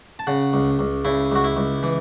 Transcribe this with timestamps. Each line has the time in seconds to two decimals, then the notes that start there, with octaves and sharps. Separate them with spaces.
0.19 A5
0.27 C#3 F#5
0.53 C#2
0.79 C#2
1.05 C#3 E4
1.31 C#2 F#4
1.44 E4
1.57 C#2
1.83 E3